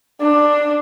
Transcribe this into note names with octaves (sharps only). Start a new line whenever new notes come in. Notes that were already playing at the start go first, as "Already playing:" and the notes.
D4